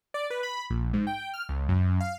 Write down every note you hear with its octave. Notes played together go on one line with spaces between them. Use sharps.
D5
B4
B5
A#1
G#2
G5
F6
C#2
F#2
F5